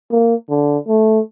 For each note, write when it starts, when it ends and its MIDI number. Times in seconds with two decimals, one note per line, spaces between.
0.12 0.35 58
0.50 0.78 50
0.88 1.20 57